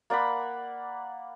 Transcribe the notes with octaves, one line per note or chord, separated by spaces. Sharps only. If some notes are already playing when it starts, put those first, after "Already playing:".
A#3 D5 F#5 B5